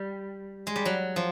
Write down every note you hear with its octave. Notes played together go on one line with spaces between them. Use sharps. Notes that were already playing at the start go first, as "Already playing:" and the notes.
Already playing: G3
G#3
G3
F#3
F3